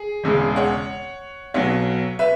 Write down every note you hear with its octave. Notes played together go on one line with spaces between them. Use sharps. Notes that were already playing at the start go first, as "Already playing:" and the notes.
Already playing: G#4
E1 E2 C#3 G#3
C#5 F#5
B1 B2 F#3 C#5 F#5
B4 E5